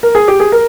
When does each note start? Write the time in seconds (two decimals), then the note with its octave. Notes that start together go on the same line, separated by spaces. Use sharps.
0.03 A#4
0.15 G#4
0.28 G4
0.40 G#4
0.52 A#4